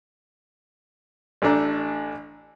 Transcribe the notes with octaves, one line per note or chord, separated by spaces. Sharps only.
A1 A3 D4 A#5